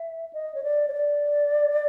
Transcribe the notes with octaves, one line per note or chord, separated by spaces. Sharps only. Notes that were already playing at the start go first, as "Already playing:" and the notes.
Already playing: E5
D#5
C#5
D5
C#5
D5